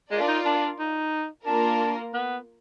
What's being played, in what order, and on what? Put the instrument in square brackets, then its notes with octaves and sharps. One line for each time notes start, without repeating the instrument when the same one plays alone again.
[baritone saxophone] G#3 [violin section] F4 A#4 D5
[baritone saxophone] D4
D#4
D4
D#4
[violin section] A#3 F4 A#4 [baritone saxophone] D4
[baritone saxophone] B3